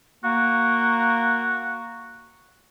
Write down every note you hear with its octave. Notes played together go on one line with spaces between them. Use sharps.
A#3 F#4